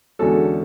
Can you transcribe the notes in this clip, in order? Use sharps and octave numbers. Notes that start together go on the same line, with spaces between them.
E2 D3 G#3 C#4 F#4 A4